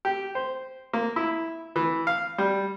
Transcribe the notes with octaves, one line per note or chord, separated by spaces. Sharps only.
G4
C5
A#3
E4
E3
F5
G3